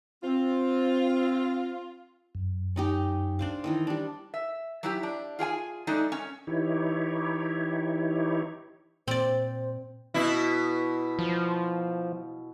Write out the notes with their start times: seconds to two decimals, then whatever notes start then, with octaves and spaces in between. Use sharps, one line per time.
0.23 C4 F4
2.35 F#2
2.76 C#4 D#4 G4
3.39 D4 C5 F5
3.64 D#3 E3 D#4
3.87 G3 D4
4.34 E5
4.83 F#3 E4 G4
5.03 D4
5.39 F4 G#4 G5 G#5
5.87 G#3 A3 D4 D#4
6.12 C#4
6.47 E3 D#4 E4 G4 C#5
9.08 A#2 C4 C5 D5
10.14 B2 E4
11.19 F3